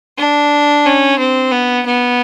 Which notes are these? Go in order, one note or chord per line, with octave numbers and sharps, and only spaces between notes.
D4
C#4
C4
B3
B3